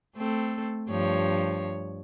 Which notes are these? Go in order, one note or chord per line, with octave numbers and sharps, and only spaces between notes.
A3 C4 A4
G2 F3 C#5